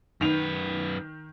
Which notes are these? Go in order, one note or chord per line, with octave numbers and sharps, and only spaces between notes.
F#2 D#3 B4 F7